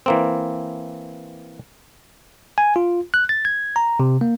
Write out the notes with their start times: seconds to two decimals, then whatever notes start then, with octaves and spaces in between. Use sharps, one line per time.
0.06 E3 A#3 C4
2.58 G#5
2.76 F4
3.14 F#6
3.29 A6
3.45 G#6
3.76 A#5
4.00 C3
4.21 A#3